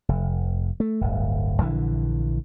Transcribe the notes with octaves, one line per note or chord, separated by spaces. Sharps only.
F1
A3
D1 G1
A#1 D3 E3